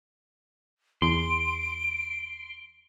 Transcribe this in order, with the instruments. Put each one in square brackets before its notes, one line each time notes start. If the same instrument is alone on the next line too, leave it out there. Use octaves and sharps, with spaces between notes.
[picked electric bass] E2 [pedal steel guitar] C6 [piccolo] D7